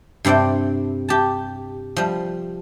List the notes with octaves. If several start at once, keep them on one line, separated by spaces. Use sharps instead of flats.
G2 C3 C4 D5 G5
G4 A5
F3 G3